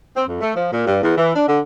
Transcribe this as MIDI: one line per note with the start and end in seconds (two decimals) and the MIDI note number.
0.15 0.23 60
0.27 0.38 41
0.41 0.52 57
0.55 0.69 53
0.71 0.86 46
0.87 0.98 43
1.02 1.16 40
1.17 1.31 52
1.35 1.46 62
1.48 1.59 50